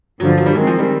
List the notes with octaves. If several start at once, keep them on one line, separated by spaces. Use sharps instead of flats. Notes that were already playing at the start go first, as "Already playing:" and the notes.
G2 D3 F3 F#3
F#3
G3
D#3 F#3 G#3 C4
F3
G3